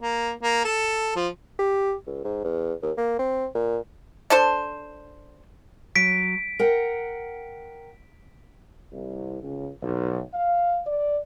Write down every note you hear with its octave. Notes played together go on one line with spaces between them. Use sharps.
A#3
A#3
A4
F3
G4
C#2
G#2
E2
D#2
A#3
C4
A#2
D4 A4 C5
F#3 B6 D7
A#4 F#5 G5
C2
C#2
B1
F5
D5